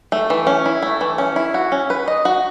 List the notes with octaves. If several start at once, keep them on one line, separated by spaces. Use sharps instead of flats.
A3
E3
C#4
E4
A3
E3
C#4
E4
F#4
C#4
B4
D#5
F#4